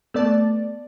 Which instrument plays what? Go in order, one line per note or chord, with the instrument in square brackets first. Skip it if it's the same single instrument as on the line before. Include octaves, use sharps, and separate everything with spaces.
[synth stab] A3 B3 D5 A5